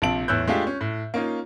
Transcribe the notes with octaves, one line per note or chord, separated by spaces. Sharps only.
A#1 C3 F4 A5 D7 F#7
E2 A2 C#5 E6 F#6 G6
G#3 A3 D4 F4 G4
C#4
A2
A#3 C#4 D#4 F4